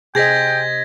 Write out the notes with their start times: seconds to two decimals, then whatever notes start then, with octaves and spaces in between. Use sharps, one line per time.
0.15 C3 G#4 C5 D#5 G5 G#6 A#6 B6